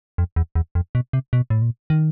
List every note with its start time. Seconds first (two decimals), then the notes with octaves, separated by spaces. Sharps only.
0.18 F2
0.36 E2
0.55 E2
0.75 F2
0.95 B2
1.13 C3
1.33 B2
1.50 A2
1.62 A#2
1.90 D#3